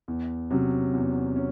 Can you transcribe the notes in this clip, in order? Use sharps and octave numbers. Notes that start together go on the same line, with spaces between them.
E2
C3 F#3 C#4
E2
C#4